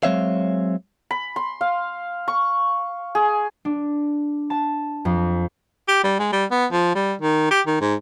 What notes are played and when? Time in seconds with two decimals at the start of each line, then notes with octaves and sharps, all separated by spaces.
0.03 F#3 G#3 C4 C#5 E5 F5
1.11 B5
1.36 C6
1.61 F5
2.28 C#6
3.15 G#4
3.65 D4
4.50 A5
5.05 F2
5.88 G4
6.04 G3
6.19 G#3
6.33 G3
6.51 B3
6.72 F3
6.95 G3
7.21 D#3
7.51 G4
7.67 D#3
7.81 G#2